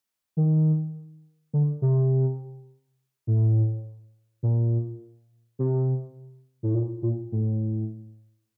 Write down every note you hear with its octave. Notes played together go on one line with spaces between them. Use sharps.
D#3
D3
C3
A2
A#2
C3
A2
A#2
A#2
A2